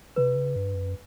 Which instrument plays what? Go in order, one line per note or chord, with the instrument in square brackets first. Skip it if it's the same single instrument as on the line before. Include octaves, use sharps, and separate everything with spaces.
[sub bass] C3 [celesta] B4
[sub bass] C#3
G2
F#2